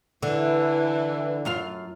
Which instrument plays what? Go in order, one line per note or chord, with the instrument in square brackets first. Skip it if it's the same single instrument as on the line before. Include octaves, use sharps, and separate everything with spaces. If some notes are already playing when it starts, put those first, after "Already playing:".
[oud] D3 [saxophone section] E3
[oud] F#2 F4 F5